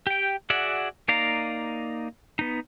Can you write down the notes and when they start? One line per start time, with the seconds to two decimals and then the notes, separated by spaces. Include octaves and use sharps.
0.07 G4 G5
0.50 F#4 G#4 D5 E5 F#5
1.08 A#3 D#4 D5 F5 A#5
2.39 B3 D#4